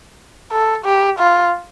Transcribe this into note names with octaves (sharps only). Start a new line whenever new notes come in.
A4
G4
F4